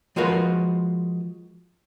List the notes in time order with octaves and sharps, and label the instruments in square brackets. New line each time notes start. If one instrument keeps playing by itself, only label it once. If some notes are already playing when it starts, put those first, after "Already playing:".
[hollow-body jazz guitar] F3 G#3 F4 F#4 A#4 B4